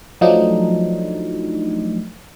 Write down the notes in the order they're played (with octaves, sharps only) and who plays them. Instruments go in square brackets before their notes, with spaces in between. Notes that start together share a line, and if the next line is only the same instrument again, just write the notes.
[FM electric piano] F3 F#3 A3 D4 D#4